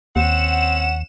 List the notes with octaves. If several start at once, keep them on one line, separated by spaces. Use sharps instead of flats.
D#2 C4 C#4 F#5 E7